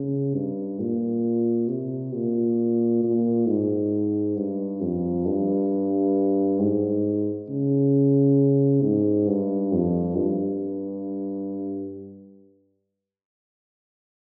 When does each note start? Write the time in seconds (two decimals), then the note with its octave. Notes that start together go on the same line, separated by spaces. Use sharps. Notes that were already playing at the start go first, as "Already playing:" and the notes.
Already playing: C#3
0.35 G2
0.80 A#2
1.68 C3
2.14 A#2
3.03 A#2
3.47 G#2
4.37 G2
4.81 F2
5.26 G2
6.60 G#2
7.49 C#3
8.83 G#2
9.28 G2
9.72 F2
10.17 G2